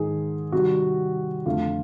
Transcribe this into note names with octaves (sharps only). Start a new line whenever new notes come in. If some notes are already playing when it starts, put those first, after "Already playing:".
Already playing: G#2 D#3 G#3 G#4
C3 D#3 G3 F#4
F2 D3 F3 A3 F4